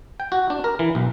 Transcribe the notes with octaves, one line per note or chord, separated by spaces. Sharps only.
G5
F#4
D4
A#4
E3
B1